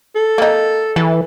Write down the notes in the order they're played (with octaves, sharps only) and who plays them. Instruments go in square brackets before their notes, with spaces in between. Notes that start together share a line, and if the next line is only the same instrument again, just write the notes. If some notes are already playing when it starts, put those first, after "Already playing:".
[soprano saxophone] A4
[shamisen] A#3 D#4
[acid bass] E3 [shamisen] A4